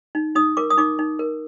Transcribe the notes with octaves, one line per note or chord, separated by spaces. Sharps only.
D#4
D#4 D#6
A#4 D6
D#6
D#4 D6
D#4
A#4